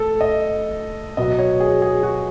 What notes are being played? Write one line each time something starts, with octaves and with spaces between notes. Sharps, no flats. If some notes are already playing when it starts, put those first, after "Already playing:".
Already playing: A3 A4
D#5
B2 F#3 B3 D#5
C#5
G#4
G#4
F#4